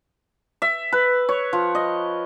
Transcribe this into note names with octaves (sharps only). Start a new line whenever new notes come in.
E5
B4
C#5
F3
D#5